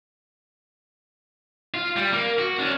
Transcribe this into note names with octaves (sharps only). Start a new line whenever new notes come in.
F4
G3
A#3
F#4
C#4 D4